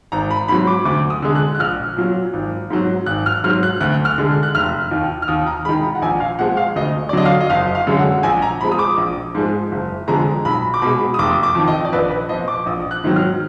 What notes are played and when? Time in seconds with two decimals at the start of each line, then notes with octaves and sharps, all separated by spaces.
0.12 G#1 A#5
0.30 B5
0.48 G#2 F#3 B5
0.67 D6
0.85 D2 D6
1.10 D#6
1.22 D3 G#3
1.35 F#6
1.55 F#6
1.60 A#1 F6
1.97 A#2 F#3
2.33 G#1
2.70 G#2 F#3
3.06 G#1 F#6
3.26 F6
3.44 G#2 F#3 F6
3.63 F#6
3.81 D2 F#6
4.05 F6
4.18 D3 G#3
4.43 F#6
4.55 F1 F6
4.91 D#2 D#3
5.22 F6
5.28 D#2 D#6
5.47 A#5
5.65 D#3 G#3 B5
5.83 A#5
5.95 F#5
6.02 A#1 G#5
6.20 F5
6.39 A#2 F3 G#3 F#5
6.57 F5
6.76 D2 D#5
7.09 D5
7.13 D3 F#3 D#5
7.25 F5
7.41 D#5
7.50 F#1 F5
7.75 F5
7.87 F#2 D3 G#3
7.99 F#5
8.23 A#1 G#5
8.42 A#5
8.60 A#2 F3 G#3 B5
8.72 D#6
8.79 D6
8.97 A#1
9.35 G#2 F3 G#3
9.72 F#1
10.08 F2 D3 G#3 A#5
10.45 B1 B5
10.74 D6
10.82 B2 G#3 B5
11.14 D#6
11.18 F1 D6
11.43 D6
11.55 F2 D#3
11.67 D#5
11.85 D5
11.93 A#1 B4
12.11 B4
12.29 A#2 F3 D#5
12.48 D6
12.66 A#1 D#6
12.91 F#6
13.04 G#2 D#3 F#3
13.16 F6